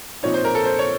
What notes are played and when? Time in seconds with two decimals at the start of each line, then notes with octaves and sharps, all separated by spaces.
0.23 A#2 F3 C4 D#4 C#5
0.34 C5
0.45 A#4
0.55 A4
0.65 C5
0.79 C#5